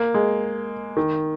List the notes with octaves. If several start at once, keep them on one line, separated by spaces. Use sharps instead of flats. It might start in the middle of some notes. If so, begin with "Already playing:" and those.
Already playing: A#3
G#3
D#3